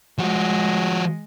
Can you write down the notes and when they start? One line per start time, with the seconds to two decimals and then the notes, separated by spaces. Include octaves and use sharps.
0.19 F3 G#3 F#4